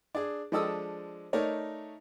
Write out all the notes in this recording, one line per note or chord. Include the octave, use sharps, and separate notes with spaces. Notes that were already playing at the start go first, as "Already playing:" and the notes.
D4 G#4
F3 G#3 D4 A4 D#6 E6
A3 D#4 A#4 C#5 D5